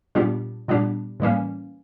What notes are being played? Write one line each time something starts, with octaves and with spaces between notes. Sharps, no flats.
A#2 G3 B3 D4 G4
A#2 G3 B3 D4 G4
A2 E3 G3 A#3 C#4